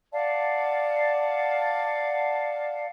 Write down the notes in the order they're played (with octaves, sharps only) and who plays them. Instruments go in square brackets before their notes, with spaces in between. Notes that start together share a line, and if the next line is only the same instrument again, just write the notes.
[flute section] D5 F5 F#5 A5